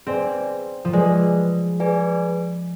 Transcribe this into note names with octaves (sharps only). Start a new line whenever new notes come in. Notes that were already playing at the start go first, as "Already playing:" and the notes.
C4 G#4 B4 D5 G#5
F3
G#3 G#4 B4 D5 G#5
G#4 B4 D5 G#5